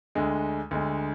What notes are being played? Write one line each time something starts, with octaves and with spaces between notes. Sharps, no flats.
D2 D3 G#3
D2 D3 G#3